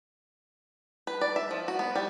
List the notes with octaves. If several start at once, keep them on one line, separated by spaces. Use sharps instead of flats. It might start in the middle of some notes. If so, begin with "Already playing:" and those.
B4
D5
E5
F3
F#4
B3
G3